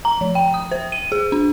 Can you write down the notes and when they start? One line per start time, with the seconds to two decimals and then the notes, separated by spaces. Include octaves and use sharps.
0.05 A#5
0.21 F3
0.35 G5
0.54 D#6
0.72 C5
0.92 D#7
1.12 G#4
1.32 D4